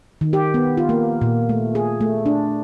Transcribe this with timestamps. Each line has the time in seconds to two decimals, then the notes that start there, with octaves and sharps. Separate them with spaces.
0.21 D#3
0.33 G4
0.54 B3
0.78 F4
0.89 A#3
1.21 A#2
1.49 A3
1.75 G#4
2.01 A3
2.26 D4